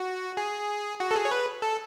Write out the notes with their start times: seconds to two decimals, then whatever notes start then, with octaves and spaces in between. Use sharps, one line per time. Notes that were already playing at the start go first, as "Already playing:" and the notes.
Already playing: F#4
0.37 G#4
1.00 F#4
1.11 A4
1.16 G#4
1.25 C#5
1.31 B4
1.62 A4